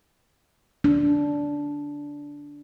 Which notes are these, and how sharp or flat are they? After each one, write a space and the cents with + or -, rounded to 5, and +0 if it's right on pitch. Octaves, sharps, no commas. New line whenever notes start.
D4 -15